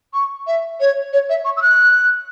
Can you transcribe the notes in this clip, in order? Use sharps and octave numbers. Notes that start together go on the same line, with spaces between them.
C#6
E5
C#5
C#5
E5
C#6
E6
F#6